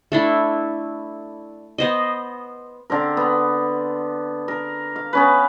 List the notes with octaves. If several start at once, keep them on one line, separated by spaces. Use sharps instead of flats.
A3 D4 E4
B3 C5 D#5
D3 C4 A#4
B3
A#4
F5
B3 C#4 B4